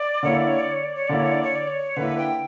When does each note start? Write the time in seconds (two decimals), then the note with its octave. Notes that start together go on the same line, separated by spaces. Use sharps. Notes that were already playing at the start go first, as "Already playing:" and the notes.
Already playing: D5
0.23 D3 A#3 E4 C#5
0.35 D5
0.47 C#5
0.59 D5
0.71 C#5
0.83 D5
0.95 C#5
1.07 D3 A#3 E4 D5
1.19 C#5
1.31 D5
1.43 C#5
1.55 D5
1.67 C#5
1.97 D3 A#3 E4 B4
2.18 G5